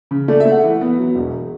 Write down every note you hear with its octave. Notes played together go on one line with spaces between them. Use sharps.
C#3
A3 D5
E5
A3
F#5
E3
B3
F#3
E1